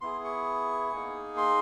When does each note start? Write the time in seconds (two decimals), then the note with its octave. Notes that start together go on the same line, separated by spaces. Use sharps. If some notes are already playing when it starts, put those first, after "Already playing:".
0.01 B3 E4 G#4 C6
0.24 C#6
0.92 A#3 D#4 G#4
1.37 C6